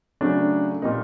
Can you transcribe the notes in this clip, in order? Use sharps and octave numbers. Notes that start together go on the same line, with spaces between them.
C#3 F#3 A3 D4
A#2 G3 A#3 D#4